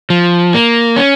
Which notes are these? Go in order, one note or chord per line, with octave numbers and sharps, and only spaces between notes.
F3
A#3
C#4